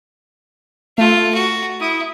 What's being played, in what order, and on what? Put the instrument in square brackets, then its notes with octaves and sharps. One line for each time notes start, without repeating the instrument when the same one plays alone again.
[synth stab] A3 [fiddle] F4 A4
[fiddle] F#4
[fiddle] E4 [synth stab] D#6